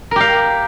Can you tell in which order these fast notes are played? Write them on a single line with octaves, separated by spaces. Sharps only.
A#4 G4 F5